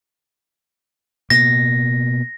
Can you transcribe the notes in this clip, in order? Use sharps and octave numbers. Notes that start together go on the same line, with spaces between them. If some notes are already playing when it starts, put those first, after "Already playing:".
B2 A#3 A#6